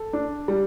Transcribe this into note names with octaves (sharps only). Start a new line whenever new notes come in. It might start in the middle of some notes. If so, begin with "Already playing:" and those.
Already playing: A4
D4
G3